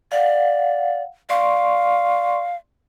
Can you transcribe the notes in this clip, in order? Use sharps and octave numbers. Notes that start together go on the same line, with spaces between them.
D5 F5 F#5
D5 F5 C6 C#6